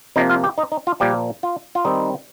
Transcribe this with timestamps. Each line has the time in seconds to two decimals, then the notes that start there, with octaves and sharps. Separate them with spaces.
0.16 C3 F3 A#3 D#4 D#5
0.30 F4 F5
0.44 G4 G5
0.58 D#4 D#5
0.72 D#4
0.87 F4
1.00 A#2 F3 G3 A#3 G4
1.43 F4
1.75 F4
1.85 D#3 G3 C4 D#4